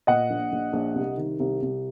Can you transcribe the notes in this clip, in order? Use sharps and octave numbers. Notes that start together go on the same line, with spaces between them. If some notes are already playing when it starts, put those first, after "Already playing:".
A#2 D#5 F#5
A#1
A#1
A#1
C2
D#3
C2
C2